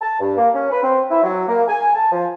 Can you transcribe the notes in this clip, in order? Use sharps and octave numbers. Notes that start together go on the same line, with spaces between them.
A5
G2
A#3
C#4
B4
C4
E4
F#3
A#3
G#5
A5
F3